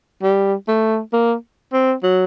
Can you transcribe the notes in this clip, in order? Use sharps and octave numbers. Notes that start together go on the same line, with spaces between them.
G3
A3
A#3
C4
F#3